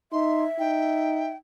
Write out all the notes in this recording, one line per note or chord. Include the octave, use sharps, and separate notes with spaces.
D#4 E5 C6
D#4 G5